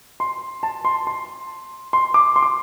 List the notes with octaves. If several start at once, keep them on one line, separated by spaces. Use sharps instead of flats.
C6
A5
C6
C6
C6
D6
C6
D6